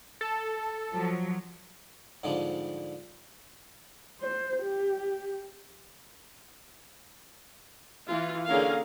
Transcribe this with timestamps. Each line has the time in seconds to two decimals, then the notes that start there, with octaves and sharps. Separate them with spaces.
0.21 A4
0.94 F3 F#3
2.23 G#2 D3 F3 G3 C#4 D4
4.21 C5
4.63 G4
8.08 E3 F4
8.47 D3 A#3 C#4 G#4 A#4 F5